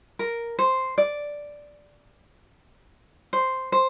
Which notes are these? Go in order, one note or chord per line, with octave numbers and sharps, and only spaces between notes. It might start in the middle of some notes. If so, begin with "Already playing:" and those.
A#4
C5
D5
C5
C5